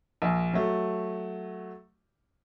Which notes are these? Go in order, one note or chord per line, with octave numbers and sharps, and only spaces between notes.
A#1
F#3 A3